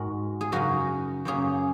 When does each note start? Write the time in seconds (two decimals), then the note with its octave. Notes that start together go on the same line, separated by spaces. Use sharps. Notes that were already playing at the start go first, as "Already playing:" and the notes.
Already playing: G#2 G#3 F#4 A#4
0.41 G#4
0.52 F#2 C#3 F#3 D#4 F#4 A#4
1.25 F#2 C#3 A#3 C#4 G#4